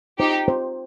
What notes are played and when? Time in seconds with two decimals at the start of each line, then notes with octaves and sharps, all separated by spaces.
0.19 D#4 G4 C5
0.48 C5